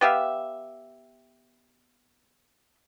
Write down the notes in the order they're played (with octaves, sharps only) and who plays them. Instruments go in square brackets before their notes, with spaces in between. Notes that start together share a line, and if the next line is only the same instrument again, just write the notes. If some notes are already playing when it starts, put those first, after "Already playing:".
[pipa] B3 G4 E5 F5